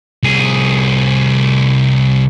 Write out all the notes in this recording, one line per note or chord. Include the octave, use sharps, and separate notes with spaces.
C2 G#4